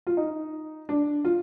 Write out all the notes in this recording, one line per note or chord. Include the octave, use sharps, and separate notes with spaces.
F4
D#4
D4
F4